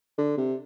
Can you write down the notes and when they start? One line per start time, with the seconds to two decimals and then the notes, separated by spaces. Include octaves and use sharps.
0.18 D3
0.38 C3